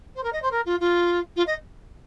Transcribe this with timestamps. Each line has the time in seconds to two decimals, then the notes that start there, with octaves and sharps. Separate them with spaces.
0.15 C5
0.23 A#4
0.32 D#5
0.42 C5
0.51 A#4
0.65 F4
0.80 F4
1.36 F4
1.46 D#5